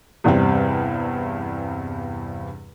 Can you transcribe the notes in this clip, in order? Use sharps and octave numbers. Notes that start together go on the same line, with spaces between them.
E2 G2 C3 G3 C4